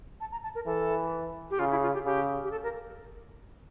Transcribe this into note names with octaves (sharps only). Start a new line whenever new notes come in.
A5
A#5
A5
A#4
E3 A4
G4
C#3 F4
E4
F4
G4
C#3 G4
G4
A4
A#4